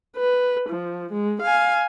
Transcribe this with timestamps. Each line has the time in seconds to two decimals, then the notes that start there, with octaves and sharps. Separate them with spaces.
0.16 B4
0.69 F3
1.12 G#3
1.42 F5 G#5